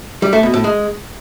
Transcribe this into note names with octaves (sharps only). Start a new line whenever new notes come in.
G3
A3
B2
A2
G#3